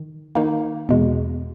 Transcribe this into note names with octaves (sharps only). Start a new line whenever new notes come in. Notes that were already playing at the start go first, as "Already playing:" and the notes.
Already playing: D#3
D#3 A#3 D#4
E2 B2 G#3